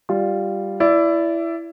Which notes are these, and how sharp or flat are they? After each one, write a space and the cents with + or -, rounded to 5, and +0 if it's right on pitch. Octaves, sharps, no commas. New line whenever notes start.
G3 +0 F4 +0
E4 +15 D5 -20